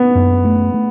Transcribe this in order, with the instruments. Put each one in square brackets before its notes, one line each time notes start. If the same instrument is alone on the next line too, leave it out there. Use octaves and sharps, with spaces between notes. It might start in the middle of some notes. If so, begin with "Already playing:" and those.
Already playing: [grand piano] B3
[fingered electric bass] F#2
A3
A3